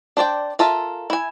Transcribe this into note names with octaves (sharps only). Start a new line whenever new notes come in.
D4 C5 D5 G5
F4 A4 A#4 E5
E4 G#5